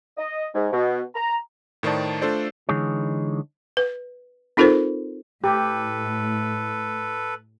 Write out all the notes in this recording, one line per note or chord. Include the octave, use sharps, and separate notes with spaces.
D#5
G#2
B2
A#5
A2 D#3 C5 D5 A5
A3 D4 F4 A4 C5 D5
D3 E3 G#3 D#4 G#4 C#5
B4
C4 D#4 F4 A4 A#4 C5
A2 G4 A4 B4